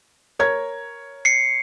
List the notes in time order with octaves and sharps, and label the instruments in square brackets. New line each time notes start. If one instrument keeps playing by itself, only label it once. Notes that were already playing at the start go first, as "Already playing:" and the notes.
[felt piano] A#4 C#5 G#6
[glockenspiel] C7 C#7